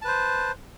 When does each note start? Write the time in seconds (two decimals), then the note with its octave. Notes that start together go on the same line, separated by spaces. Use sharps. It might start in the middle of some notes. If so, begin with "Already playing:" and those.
0.02 A5
0.05 B4
0.08 C5